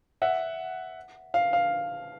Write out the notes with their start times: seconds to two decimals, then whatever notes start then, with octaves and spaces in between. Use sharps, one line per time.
0.22 E5 F#5
1.34 F5
1.53 F5